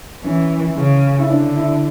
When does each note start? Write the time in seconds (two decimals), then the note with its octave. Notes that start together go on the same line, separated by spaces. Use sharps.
0.24 E3 C#4
0.77 C#3
1.19 E4
1.30 D3 D4
1.56 E4